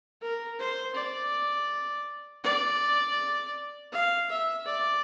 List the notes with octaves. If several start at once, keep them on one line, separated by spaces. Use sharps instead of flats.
A#4
C5
D5
D5
F5
E5
D5